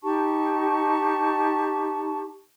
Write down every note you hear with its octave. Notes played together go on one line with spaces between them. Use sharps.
D#4 G4 A5 C#6